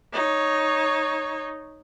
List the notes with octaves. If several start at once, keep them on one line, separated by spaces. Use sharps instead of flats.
D#4 C#5